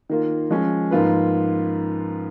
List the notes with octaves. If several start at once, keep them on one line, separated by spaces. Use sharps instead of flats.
D#3 A#3 F4
F3 G#3 C#4
G#2 F3 A#3 F4 B4